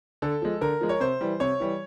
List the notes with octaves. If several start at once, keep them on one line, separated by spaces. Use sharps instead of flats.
D3 A4
F3 G#3
D3 A#4
F3 G#3
C#5
C3 C5
E3 G3
C3 C#5
E3 G3